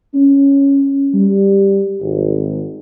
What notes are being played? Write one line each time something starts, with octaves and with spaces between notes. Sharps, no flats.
C#4
G3
G#1